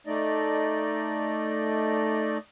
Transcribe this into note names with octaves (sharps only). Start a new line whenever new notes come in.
A3 D#4 D5 D#5